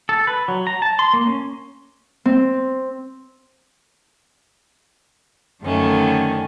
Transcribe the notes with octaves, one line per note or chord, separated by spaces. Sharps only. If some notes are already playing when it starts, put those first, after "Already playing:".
A4
B4
F#3
A#5
A5
C6
A#3
C#4
C4
F#2 D3 D#3 A3 C#4